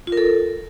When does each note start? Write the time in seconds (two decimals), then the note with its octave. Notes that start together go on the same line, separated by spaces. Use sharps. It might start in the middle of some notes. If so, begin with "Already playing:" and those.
0.07 F4
0.12 A#4
0.17 A4